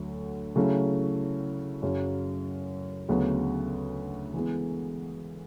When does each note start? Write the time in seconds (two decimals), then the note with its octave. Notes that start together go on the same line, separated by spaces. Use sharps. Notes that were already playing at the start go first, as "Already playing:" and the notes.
Already playing: D2 D3 F#3 A3
0.56 C#3 F#3 A3 C#4 E4
1.82 F#2 C#3 F#3
3.09 D2 C#3 F#3 B3
4.34 E3 G#3 B3